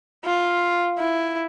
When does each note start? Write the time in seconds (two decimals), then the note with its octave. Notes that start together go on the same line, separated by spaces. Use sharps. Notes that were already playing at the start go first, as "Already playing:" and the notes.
0.25 F4
0.98 E4